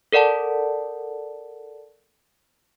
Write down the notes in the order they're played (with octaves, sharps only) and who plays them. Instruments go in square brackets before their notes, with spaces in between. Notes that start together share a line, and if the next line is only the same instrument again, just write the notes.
[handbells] A4 A#4 D5 F#5 A5